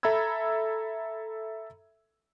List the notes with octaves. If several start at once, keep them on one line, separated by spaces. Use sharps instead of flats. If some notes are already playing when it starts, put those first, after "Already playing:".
A4 E5 A#5 B5 E6 G#6